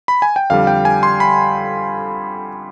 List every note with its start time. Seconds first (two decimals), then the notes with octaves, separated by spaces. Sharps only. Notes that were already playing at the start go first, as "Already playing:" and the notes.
0.08 B5
0.22 G#5
0.36 G5
0.50 F2 D3 G3 F5
0.67 G5
0.85 G#5
1.03 C6
1.20 B5